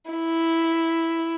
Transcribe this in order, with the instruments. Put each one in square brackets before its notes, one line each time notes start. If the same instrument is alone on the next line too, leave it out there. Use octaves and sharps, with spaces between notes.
[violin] E4